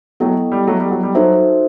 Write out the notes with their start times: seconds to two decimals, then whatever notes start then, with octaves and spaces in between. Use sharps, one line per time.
0.20 F#3 A3 B3 E4 A4 D#5 G5
0.52 G3
0.67 F#3 A3
0.79 G3
0.91 F#3
1.03 G3
1.15 F#3 D#4 F#4 A4 C5 E5